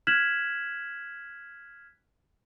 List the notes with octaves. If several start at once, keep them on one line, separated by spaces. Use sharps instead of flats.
F6 F#6 G#6 B6 E7 F#7